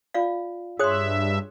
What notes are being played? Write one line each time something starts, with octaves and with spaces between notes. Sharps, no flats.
F4 D5 F5
G2 G#4 C#5 E5 C6 D#6 F#6